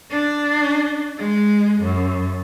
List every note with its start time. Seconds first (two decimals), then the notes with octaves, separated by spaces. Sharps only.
0.11 D4
1.18 G#3
1.82 F#2